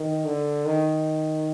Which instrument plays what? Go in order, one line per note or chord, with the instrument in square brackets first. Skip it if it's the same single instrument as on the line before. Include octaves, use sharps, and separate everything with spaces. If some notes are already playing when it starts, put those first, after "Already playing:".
Already playing: [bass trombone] D#3
D3
D#3